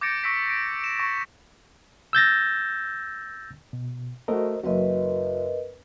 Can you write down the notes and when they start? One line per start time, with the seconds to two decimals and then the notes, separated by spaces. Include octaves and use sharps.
0.01 D6 G6 A6 A#6 C#7 D7
0.23 C#6 E6 A#6 B6 D7
0.50 D7
0.84 E7
0.98 C#6 A6 A#6
2.13 E6 G6 A6 A#6
3.73 B2
4.28 A3 F#4 A#4 C5 D#5
4.64 F#1 F#2 F#4 A#4 B4 D#5